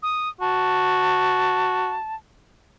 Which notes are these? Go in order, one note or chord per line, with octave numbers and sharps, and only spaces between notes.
D#6
F#4 A5